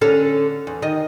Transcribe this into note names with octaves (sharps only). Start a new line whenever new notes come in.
D3 C#4 A4
E2
D#3 D#5